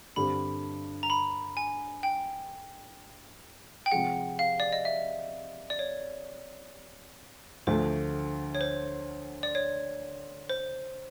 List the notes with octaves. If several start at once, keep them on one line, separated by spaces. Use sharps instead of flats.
G2 D3 G3 C4 B5
A#5
B5
G#5
G5
G5
C3 F3 G#3 F#5
F5
D5
D#5
E5
D5
C#5
D2 D3 F3 A3 C5
C#5
C5
D5
C#5
C5